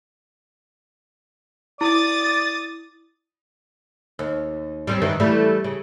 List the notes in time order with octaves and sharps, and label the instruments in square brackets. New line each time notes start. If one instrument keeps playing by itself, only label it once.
[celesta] E4 [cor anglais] D5 [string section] D#6 A6
[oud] D#2
G3 C4 C#4
G2 D#3 E3
E3 G3 A3
C#3